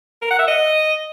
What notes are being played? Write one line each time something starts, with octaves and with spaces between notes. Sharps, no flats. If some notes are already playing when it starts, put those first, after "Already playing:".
A#4
F#5
E5
D#5